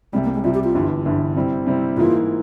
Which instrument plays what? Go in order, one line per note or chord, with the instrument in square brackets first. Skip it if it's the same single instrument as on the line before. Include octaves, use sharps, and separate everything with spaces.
[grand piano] C2 C3 G3 [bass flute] G#3
[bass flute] A#3
G#3
[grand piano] C2 C3 G3 [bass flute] F4
[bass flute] G4
F4
[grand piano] G1 G2 E3
G1 G2 E3
C3 G3 C4 E4
C3 G3 C4 E4
[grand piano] G#2 E3 A#3 E4 [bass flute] F4